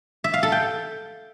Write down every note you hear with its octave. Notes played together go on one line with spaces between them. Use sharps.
E5
F5
A4
G5